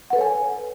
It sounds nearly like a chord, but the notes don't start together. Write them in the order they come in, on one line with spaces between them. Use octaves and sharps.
F#5 B4 A4 C#5 G#5